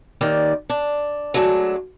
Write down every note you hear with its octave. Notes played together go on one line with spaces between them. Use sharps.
D#2 D#3 D5
D4
F#3 G#3 A3 D4